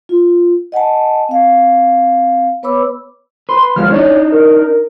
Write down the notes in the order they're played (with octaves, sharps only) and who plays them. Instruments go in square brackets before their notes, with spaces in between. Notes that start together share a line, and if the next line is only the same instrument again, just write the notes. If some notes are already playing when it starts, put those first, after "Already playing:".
[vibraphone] F4
D#5 F#5 G#5 A5
C4 F5
B3 B4 C#5 B5 D6 E6
[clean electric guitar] B4 [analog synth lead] C6
[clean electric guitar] D#2 F3 G#3 [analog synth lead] F6
[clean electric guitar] D4 D#4 [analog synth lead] C#5
[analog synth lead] A#4